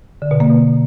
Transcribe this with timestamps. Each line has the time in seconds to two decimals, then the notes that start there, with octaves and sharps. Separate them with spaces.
0.22 D3
0.31 B2
0.40 A#3
0.50 B2